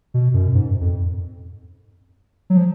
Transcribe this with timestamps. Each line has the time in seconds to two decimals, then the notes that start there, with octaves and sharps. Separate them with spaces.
0.14 B2
0.34 F#2
0.54 G#2
0.81 F2
2.50 F#3
2.57 F3